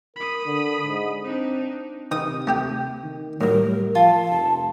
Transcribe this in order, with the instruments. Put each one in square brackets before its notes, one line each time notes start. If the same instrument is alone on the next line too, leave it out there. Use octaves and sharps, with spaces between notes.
[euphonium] A#4 [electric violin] B5 D#6
[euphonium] D3
G#2
[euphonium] C4 [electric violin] D4 D#4
[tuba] C3 [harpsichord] D#3 [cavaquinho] D#6
[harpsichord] A3 G4 G5
[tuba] D#3
[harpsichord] A2 F#3 [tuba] G3 [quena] A#4
[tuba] F3 [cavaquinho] F4 [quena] A5
[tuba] F1